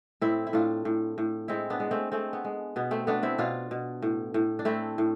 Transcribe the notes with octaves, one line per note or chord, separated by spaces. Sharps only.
A2 C4 E4
E4
A2 D4 F4
A2
A2
G#3 C4 E4
B3 D4
G#3
A3 C4
G#3 A3 C4
B3
G#3
B2 B3
A3 C4
A3 B3 D4
C4 E4
B2 D4 F4
B2
A2
A2
D4
A3 C4 E4
A2